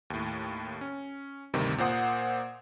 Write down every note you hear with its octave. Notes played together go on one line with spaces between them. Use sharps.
D#2 A2
C#4
D2 G2 C3 D#3
A#2 A#3 C5 F#5 D#6